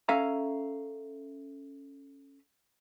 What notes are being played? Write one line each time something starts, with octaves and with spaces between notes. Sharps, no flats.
C#4 A4 E5 F5 G#5 A#5